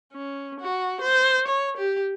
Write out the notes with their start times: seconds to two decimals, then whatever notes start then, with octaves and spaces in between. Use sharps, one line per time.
0.13 C#4
0.60 F#4
1.01 C5
1.48 C#5
1.78 G4